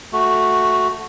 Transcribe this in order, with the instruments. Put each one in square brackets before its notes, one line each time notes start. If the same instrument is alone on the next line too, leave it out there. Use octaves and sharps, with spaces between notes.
[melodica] A3 F#4